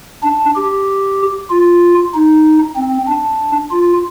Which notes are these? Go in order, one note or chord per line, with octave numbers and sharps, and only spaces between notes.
D4
G4
F4
D#4
C4
D4
F4